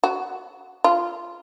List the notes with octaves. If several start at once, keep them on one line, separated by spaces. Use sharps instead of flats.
F#4
F4